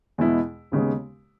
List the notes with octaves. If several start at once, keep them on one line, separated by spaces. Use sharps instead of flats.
E2 B2 G#3 B3 E4
D#2 C#3 G#3 B3